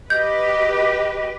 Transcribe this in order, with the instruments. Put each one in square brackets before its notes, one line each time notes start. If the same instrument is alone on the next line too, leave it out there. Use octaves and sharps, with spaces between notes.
[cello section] G4 B4 [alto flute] D#5 [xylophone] G6